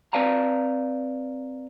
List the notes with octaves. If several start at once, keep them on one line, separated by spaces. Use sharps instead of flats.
C4 B4 D5 F5 A5 A#5